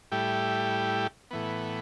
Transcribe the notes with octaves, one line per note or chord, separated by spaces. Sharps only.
A2 G3 E4 G4
A2 E3 B3